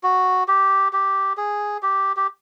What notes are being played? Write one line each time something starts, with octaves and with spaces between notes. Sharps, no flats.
F#4
G4
G4
G#4
G4
G4